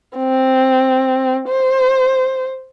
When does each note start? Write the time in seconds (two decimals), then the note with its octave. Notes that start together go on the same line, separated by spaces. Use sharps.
0.17 C4
1.48 C5